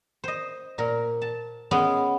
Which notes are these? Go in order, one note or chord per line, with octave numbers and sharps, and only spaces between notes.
C5 D#5
A#2 A#4
A5
G#3 B3 C#4